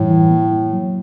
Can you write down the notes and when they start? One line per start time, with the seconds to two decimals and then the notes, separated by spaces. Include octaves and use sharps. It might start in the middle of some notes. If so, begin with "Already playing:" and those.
Already playing: F#2 A2 E3 G3
0.10 E3
0.30 A#3
0.51 E4
0.72 F#3